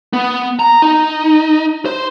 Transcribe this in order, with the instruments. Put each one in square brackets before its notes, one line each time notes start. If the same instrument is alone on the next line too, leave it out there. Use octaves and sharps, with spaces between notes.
[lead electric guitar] B3
A#5
D#4
C5